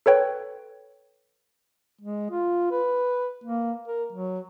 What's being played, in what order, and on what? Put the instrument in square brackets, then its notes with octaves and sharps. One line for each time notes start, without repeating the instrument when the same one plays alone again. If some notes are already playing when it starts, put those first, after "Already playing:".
[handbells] A4 B4 C#5 G5
[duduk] G#3
F4
B4
A#3
A#4
F#3